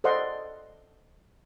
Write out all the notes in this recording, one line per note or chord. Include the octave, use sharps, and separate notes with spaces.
A4 C5 D5 D#5 F#5 C6